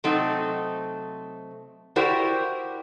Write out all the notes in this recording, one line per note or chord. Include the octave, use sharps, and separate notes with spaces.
C3 F#3 A3 C4 D#4
E4 F#4 G4 A#4 C5 D5